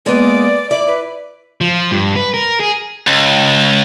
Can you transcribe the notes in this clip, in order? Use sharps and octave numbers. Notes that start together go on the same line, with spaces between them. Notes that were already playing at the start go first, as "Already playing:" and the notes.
G#3 A#3 B3 D5
E4 D5 D6
B4
F3
G2
B4
A#4
G#4
C#2